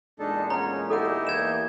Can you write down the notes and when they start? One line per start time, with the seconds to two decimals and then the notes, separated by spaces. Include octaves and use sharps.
0.19 E2 A#2 G#3 D4 D#4 A4
0.50 C#4 C#5 F#5 A#5
0.90 D#4 E4 G4 A4 D#5 F#5
1.27 E2 E3 A#3 G6 G#6 E7